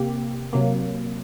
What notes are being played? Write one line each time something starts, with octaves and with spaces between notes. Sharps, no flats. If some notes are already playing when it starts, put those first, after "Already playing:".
Already playing: C3 A#3 G4
C3 F#3 A#3